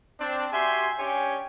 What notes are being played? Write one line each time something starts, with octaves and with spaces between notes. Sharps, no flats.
C4 D4
F#4 G4 E5 G#5 C6
C#4 D4 G4 C#5 G5 G#5